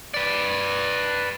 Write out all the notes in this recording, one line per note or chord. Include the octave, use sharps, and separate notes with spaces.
B4 D5